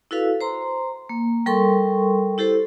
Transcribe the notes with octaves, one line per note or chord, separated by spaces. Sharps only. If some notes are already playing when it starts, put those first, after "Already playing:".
E4 F#4 A4 B4 F5
C5 A#5 C6
A#3
G3 A4 A#4 G5 C6 C#6
E4 G4 A4 C5